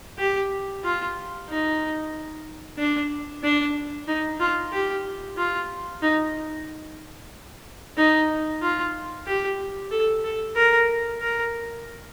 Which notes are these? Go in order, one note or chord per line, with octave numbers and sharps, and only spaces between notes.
G4
F4
D#4
D4
D4
D#4
F4
G4
F4
D#4
D#4
F4
G4
A4
A4
A#4
A#4